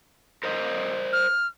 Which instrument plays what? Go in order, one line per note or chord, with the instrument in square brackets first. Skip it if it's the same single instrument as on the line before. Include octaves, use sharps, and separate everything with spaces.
[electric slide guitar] A#4 C5 D#5
[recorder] F6